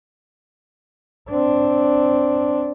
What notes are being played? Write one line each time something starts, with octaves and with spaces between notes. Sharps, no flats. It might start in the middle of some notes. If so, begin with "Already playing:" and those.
C4 D4